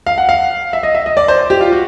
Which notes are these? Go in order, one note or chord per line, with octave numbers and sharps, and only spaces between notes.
F5
F#5
F5
E5
D#5
E5
D#5
D5
C5
G4
F4
F#4